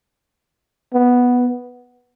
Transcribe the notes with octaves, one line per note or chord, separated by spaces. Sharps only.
B3